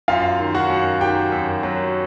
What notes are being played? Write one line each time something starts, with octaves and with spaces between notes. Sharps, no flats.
F#2 F4 F5
D#3
F#4 F#5
F#2
D#3 G4 G5
F#2
F#3